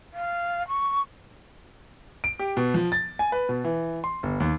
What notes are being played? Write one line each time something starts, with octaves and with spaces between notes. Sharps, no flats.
F5
C#6
D7
G4
B2
F3
A6
G#5
B4
B2
E3
C6
G1
D#2